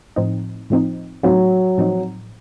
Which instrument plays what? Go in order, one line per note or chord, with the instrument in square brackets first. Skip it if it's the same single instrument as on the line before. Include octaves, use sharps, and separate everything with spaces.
[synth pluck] A2 F3 C4 D#4
A2 F3 C4 D#4
[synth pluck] A2 F3 C4 D#4 [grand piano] F#3
[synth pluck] A2 F3 C4 D#4